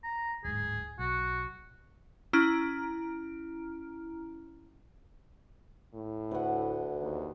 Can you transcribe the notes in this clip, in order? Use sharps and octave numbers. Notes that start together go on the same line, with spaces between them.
A#5
D1 G#2 G#4
B1 F#4
C#4 E4 A#5 F6 D7
A2
D2 B4 F#5
D#2